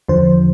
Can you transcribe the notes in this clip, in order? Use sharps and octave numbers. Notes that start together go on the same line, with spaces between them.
E2 D3 F3 C5